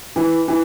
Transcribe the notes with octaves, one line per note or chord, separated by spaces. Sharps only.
E3
E3